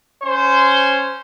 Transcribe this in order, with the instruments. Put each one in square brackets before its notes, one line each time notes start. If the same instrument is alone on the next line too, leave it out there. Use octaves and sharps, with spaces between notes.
[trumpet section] C#4 C5